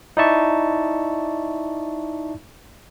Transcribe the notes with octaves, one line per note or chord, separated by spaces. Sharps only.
D#4 E4 D5 E5 A5 C#6